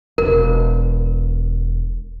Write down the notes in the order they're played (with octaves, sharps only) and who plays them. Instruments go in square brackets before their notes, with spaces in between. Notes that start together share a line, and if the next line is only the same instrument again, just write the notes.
[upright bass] E1 [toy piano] A#4